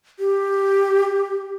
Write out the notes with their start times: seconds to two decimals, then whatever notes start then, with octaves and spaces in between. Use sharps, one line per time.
0.20 G4